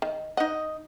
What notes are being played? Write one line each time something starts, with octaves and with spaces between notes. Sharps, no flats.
D#3
D#4 D#5 F#5